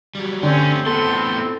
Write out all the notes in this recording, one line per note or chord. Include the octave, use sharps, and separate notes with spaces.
F#3 G3
D3 A3 C4 C#4 G4
A2 B3 A4 C6